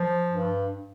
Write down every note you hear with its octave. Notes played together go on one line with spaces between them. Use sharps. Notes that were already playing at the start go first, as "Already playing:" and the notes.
Already playing: F3
G2